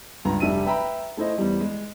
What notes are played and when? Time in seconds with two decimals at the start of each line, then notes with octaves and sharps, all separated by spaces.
0.25 C#2 G2 A#5
0.40 F1 G3 D4 E5 D#7
0.66 B4 E5 G5 A#5 B5
1.17 A3 E4 C5 D#5
1.38 E2 G3
1.60 G#3